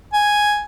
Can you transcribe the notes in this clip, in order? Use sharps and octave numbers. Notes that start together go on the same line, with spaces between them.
G#5